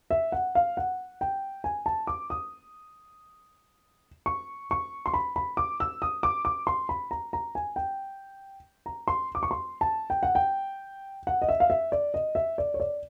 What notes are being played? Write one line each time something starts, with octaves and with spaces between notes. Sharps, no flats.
E5
F#5
F5
F#5
G5
G#5
A5
D6
D#6
C#6
C#6
C6
B5
B5
D6
E6
D#6
D6
D6
C6
B5
A#5
A#5
G#5
G5
A#5
C6
D6
C#6
C6
A5
G5
F#5
G5
F#5
D#5
E5
F5
E5
D5
D#5
E5
D5
C#5
D5